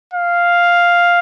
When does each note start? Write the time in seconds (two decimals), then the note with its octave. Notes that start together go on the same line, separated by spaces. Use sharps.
0.14 F5